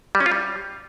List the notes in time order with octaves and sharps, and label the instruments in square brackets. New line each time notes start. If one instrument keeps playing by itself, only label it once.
[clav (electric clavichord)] G3
C#4
F4
G3